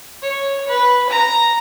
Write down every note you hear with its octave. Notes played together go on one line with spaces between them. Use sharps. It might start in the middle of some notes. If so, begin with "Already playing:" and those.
C#5
B4
A#5